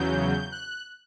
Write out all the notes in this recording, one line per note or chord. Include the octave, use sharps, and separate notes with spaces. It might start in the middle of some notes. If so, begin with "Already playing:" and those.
Already playing: E2 C#3 F#3 G6
F#6